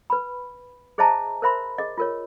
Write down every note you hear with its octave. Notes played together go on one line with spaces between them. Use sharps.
B4 B5
G#4 C5 D#5 E5 A5 A#5
A#4 C5 E5 B5 C6
G#4 D#5
F4 A#4 C#5